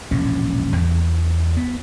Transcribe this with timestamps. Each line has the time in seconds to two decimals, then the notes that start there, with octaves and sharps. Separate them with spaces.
0.11 E1 A#1 A2 C#4
0.76 E2
1.57 B3